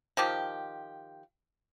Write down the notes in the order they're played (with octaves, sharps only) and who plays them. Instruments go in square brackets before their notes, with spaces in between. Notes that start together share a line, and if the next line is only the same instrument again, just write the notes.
[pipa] D#3 F3 G4